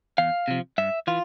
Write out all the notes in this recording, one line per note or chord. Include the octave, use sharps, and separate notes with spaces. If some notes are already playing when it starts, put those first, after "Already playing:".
E2 F5
C3 F3
G2 E5
E3 F4